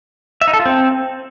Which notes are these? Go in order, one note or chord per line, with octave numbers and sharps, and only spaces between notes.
E5
D#4
A4
F4
C4